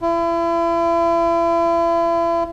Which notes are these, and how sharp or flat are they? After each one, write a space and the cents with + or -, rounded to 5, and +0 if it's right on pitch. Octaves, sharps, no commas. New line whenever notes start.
E4 +35